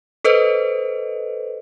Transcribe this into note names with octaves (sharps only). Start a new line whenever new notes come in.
A4 B4 C5 D#5